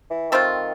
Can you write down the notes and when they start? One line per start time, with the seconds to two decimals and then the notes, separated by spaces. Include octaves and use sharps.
0.10 E3
0.31 D#3 A3 C4 F4